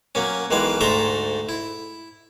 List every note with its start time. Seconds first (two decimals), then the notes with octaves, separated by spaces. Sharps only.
0.15 F#3 A#3 C#4
0.50 B1 D#3 E3 G#3 F5
0.80 D2 G#2 A3 E5 A#5 C6
1.49 E4